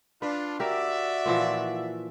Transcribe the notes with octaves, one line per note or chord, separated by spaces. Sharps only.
D4 F4 B4
F#4 G4 A#4 D5 E5
A#2 E3 F3